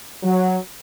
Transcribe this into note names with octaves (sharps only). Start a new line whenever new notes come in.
F#3